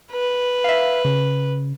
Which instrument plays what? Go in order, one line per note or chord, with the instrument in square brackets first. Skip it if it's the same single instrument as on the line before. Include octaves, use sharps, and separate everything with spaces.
[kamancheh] B4
[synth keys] E5 F5
C#3